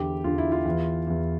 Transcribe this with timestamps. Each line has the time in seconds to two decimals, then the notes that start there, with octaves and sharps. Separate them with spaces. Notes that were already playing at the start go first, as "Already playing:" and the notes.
Already playing: E2 D3 G4
0.24 E2 D3 F4
0.38 E4
0.52 F4
0.65 E2 E3
1.07 E2 E3